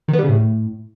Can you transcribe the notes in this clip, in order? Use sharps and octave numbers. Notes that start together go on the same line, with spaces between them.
D#3
B3
G3
C#3
A2